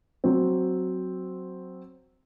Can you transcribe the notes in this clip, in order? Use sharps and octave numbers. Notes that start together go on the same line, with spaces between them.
F#3 C4